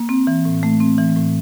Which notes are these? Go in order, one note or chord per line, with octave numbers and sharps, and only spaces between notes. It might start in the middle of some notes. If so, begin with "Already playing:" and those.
Already playing: A#3
C4
E3
A2
A3
C4
E3
A2